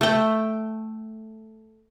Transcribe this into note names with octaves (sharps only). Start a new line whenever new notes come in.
A3 G5